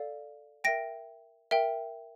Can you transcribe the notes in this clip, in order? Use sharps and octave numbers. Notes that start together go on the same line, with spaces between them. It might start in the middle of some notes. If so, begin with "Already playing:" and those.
Already playing: A4 D5 F5
A#4 E5 G5 A#6 D7
A#4 E5 G5